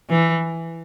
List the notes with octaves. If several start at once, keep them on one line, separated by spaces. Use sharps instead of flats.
E3